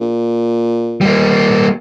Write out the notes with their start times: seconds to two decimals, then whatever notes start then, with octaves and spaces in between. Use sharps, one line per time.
0.01 A#2
1.01 G3 A#3